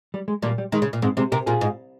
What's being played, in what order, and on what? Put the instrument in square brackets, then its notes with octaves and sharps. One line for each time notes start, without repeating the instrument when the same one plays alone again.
[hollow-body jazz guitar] G3
G#3
[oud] A#2 [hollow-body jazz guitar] G3 A#3
[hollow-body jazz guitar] G3
[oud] D#3 [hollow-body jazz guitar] G#3
[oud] C#3
A#2
[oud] G#2 [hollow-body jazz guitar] G#3 C4
[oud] C3 [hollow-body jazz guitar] G#3 C4
[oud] C3 [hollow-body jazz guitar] G4 A#4
[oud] A#2 [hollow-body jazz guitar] F4 G#4
[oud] G#2